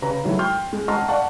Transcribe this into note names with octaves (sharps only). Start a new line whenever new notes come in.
C#3 B4 A#5
D#3 F#3 G#3 A3 E4
G5 C6 F6 G6
G#3
D#5 F#5 A5 A#5 C6 F6
D5 F5 F#5 A5 C#6